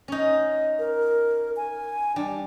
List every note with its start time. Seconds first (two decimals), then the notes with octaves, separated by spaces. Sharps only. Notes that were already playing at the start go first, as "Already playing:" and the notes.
0.08 C#4 D#4
0.79 A#4
1.57 G#5
2.16 G3 D4